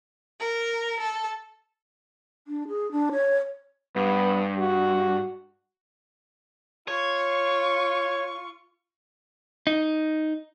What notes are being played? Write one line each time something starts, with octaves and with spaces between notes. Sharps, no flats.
A#4
A4
D4
G#4
D4
C#5
G2 B3
F#4
F4 C#5 C#6
D#4